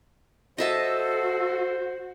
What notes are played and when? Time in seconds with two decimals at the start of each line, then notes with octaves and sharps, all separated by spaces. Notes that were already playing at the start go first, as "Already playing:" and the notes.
0.58 F#4 A4 C5 D#5 E5 A5